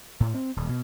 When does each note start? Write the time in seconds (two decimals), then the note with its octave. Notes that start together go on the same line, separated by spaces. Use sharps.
0.20 A2
0.34 C4
0.56 D#1
0.69 B2